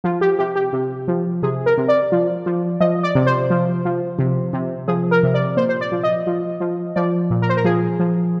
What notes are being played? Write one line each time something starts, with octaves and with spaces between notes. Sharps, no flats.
F3 F4
G4
C3 G4
G4
C3
F3
C3 G#4
A#4
C3
D5
F3
F3
F3 D#5
D5
C3
C5
F3
F3
C3
C3
F3 G#4
A#4
C3
D5
A#2 C5
C5
D5
F3
D#5
F3
F3
F3 D5
A#2
A#4
C5
A#4
F3 G#4
F3